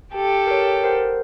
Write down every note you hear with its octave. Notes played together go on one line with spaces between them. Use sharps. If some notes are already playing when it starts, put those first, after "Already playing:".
G4 A4 G5
A#4 C#5
A#4 C5 F#5